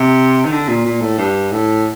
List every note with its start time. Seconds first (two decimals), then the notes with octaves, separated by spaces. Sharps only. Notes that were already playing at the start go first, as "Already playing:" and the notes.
Already playing: C3
0.45 D#3
0.52 D3
0.69 A#2
0.86 A#2
1.01 A2
1.18 G2
1.52 A2